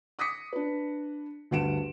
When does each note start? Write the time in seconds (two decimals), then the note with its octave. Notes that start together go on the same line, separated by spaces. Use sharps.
0.19 D6 D#6 A#6 B6 C#7
0.53 D4 B4
1.51 D2 G2 F#5 C#7 D7 E7